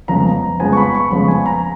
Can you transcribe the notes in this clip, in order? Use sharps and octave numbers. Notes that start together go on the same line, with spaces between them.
F2 C#3 F3 G#3 B3 A#5
F2 C#3 F3 G#3 B3 G#5
C#6
B5
C#6
F2 C#3 F3 G#3 B3 B5
G#5
A#5